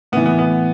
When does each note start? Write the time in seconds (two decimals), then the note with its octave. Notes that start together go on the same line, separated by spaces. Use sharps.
0.12 A2 E3 B3
0.26 B3
0.39 B3